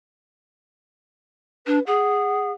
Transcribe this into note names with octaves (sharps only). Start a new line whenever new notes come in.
D4 B4
G#4 F#5